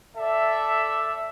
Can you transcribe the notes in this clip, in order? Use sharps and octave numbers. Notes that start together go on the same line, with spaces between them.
A4 D5 E5